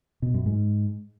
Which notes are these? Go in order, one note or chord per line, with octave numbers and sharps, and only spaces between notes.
B2
F#2
G#2